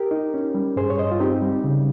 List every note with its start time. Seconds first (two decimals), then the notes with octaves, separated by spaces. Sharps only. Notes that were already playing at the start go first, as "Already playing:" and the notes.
Already playing: G4 A#4
0.11 D#4
0.34 C#4
0.55 G3
0.76 G2 G#4 C5
0.90 C#5
0.98 G2 C5 D#5
1.12 F4
1.20 C4 D#4 G4
1.42 G3
1.64 C#3